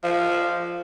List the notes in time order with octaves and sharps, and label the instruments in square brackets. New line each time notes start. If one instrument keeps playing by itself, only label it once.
[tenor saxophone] F3